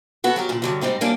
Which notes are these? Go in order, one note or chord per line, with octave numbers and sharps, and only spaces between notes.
B3 F#4 A4
F#3 G4 A#4
A#2 D3
G2 D3 F#3
G#2 G3 C4 D#4
E2 G3 A#3 C#4 D4